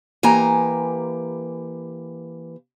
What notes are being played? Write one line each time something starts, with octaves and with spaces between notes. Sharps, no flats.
E3 A#3 G4 G#5 A#5